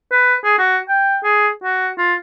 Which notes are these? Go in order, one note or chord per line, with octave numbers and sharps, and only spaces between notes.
B4
G#4
F#4
G5
G#4
F#4
F4